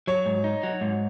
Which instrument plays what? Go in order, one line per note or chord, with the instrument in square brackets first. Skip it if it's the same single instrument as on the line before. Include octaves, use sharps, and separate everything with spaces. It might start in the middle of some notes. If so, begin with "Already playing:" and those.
[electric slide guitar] F#3 [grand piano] C#5
[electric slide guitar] G#2
D#4
F#3
G#2